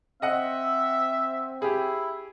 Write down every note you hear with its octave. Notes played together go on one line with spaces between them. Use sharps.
C4 D#5 E5 F#5
E4 G4 G#4